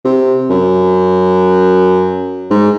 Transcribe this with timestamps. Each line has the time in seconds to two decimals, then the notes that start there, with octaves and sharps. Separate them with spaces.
0.04 C3
0.50 F#2
2.50 G#2